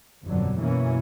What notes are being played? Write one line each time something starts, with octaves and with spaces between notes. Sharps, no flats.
G1 F2 B2 D3 F#3
F#2 B2 E3 A#3 C#4